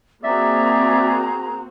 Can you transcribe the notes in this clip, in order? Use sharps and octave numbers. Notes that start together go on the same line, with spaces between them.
A#3 C4 F#4 G#4 D5 E5 A#5